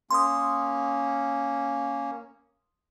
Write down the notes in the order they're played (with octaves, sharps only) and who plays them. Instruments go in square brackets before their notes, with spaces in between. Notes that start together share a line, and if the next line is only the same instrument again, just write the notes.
[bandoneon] A#3 C#4 [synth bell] C6 D#6